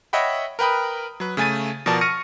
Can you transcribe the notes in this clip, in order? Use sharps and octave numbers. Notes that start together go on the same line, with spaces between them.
C#5 D#5 E5 F#5 G5 B5
A#4 B4 G5 B5 D#6
F#3 B4
C#3 A3 G#5 A6 D#7
B2 F3 A#4 D5 A5
C#6 F6 A#6 C#7 D#7